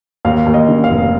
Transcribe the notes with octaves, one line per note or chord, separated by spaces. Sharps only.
D#2 F5
D#2
D#5
C#3
F5
F1